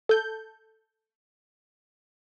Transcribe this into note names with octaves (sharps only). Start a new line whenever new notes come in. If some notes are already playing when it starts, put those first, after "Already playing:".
A4 G6